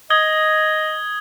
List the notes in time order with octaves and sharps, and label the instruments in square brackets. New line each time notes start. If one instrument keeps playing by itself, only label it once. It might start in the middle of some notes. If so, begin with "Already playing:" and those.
[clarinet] D#5 [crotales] D#6 G#6 G7